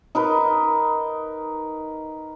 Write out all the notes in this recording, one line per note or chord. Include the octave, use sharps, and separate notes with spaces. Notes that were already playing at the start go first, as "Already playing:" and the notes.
D#4 A#4 B4 C#6